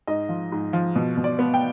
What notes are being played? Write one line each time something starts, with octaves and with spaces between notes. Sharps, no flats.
G#2 D#5
F3
G#2
F3
B2
B2
D5
B3
G5